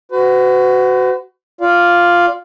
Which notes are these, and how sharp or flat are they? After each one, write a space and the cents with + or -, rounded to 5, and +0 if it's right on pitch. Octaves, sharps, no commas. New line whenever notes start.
F#4 +10 B4 +45
F4 +0 D5 -20 F5 +0